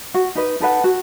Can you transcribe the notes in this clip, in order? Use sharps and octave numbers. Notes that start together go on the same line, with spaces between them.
F#4
D#4 B4 D#5
D#4 A4 B4 F#5
F#4